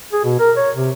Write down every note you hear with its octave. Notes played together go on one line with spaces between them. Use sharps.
G#4
B2
A#4
C#5
C3